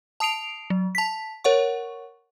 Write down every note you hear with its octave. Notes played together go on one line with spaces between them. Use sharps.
A5 D#6 C7 D7 F7
F#3
A5 B6
A#4 C#5 F#5 C#6